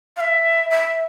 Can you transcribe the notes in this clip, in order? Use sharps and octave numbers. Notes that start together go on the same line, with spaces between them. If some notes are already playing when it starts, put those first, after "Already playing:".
F5
E5
E5